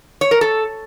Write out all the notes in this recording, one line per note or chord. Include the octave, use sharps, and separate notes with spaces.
C#5
A#4
A4